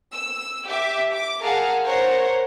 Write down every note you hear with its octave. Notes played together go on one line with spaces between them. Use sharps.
E6
G4 E5 D6
D6
G#4 A#4 F5 F#5 A5
A#4 C5 C#5 F#5